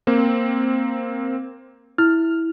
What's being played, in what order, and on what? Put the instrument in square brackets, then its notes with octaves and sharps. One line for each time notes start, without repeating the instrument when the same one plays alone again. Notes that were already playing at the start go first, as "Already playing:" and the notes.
[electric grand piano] A#3 C4
[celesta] E4 [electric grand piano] F6